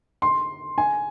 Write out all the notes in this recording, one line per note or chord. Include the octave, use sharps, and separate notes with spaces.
C6
G#5